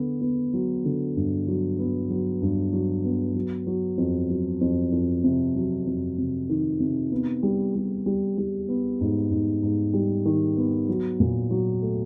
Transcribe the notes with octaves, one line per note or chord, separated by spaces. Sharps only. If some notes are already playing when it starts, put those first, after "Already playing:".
Already playing: D3 B3
B3
F#3
D3
G2
F#3
B3
F#3
G2
F#3
B3
F#3
F#3
F2
F#3
F2
F2
C3
F#3
F2
C3
D#3
C3
B3
G3
G3
G3
G3
B3
G#2
G#2
G#2
G3
D#3
B3
F#3
A#2
F#3
A3